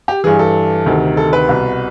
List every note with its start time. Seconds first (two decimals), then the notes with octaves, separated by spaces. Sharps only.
0.08 G4
0.24 G2 E3 G#4
0.39 A4
0.86 D2 C3 D#3
1.17 A4
1.33 B4
1.49 C2 B2